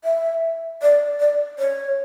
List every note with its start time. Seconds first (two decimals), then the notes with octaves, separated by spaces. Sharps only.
0.04 E5
0.82 D5
1.20 D5
1.59 C#5